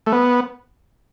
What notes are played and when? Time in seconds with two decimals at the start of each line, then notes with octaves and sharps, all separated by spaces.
0.06 A3
0.12 B3